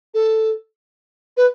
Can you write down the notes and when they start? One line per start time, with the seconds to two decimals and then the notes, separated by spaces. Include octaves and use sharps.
0.14 A4
1.37 B4